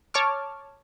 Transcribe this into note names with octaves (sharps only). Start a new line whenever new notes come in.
C#5 A5 C#6 D6 F6